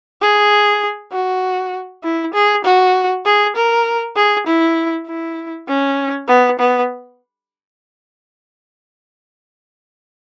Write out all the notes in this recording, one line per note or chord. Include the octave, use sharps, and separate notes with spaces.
G#4
F#4
E4
G#4
F#4
G#4
A#4
G#4
E4
E4
C#4
B3
B3